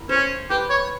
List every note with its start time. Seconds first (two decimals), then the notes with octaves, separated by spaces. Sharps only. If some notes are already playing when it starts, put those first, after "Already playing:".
Already playing: E4 A#4
0.09 C#4 C5
0.50 G4 B4
0.70 C#5